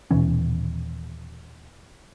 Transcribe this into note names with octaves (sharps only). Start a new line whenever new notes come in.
D#1 B2 E3 C#4